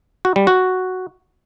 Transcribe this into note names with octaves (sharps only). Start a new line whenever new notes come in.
F#4
G3
F#4